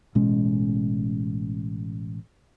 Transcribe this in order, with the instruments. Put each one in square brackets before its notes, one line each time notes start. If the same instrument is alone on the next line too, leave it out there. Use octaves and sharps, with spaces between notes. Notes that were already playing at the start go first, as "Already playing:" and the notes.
[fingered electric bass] A1 B2 G#3 C#4